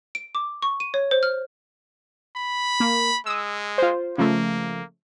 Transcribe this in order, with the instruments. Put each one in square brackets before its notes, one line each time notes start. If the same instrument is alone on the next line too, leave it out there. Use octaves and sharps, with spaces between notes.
[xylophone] D7
D6
C#6
D#7
C#5
C5
F6
[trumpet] B5
[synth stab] A#3
[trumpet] G#3 [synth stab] D#6 E6
[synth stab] F4 C5
[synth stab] C#3 F3 A3 [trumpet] A#3